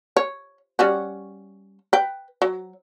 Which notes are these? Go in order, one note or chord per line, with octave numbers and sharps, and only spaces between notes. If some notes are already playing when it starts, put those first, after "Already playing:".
C#5
G3 C#4 F#4
B4 G5
F#3